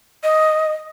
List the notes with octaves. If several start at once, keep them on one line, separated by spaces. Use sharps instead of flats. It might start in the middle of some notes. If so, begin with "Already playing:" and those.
D#5